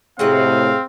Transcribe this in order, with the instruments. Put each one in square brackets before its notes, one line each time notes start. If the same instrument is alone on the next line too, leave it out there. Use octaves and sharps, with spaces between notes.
[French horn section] A2 C3 [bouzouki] G#3 F#4 B4 [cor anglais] C4 [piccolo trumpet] F5